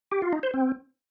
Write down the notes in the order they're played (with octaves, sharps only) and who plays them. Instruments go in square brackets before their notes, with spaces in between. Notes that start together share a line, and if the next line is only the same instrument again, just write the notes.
[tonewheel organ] G4
F4
D#4
C5
C4